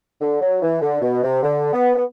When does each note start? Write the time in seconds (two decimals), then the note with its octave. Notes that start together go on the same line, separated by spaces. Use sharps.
0.21 D3
0.41 F#3
0.62 E3
0.81 D3
1.02 B2
1.23 C3
1.43 D3
1.73 B3
1.96 B3